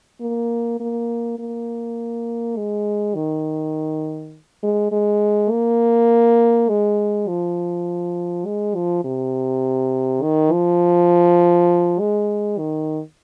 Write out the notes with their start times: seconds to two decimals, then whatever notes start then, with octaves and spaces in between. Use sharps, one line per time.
0.21 A#3
0.80 A#3
1.39 A#3
2.57 G#3
3.15 D#3
4.63 G#3
4.92 G#3
5.51 A#3
6.69 G#3
7.28 F3
8.46 G#3
8.75 F3
9.04 C3
10.23 D#3
10.52 F3
12.00 G#3
12.58 D#3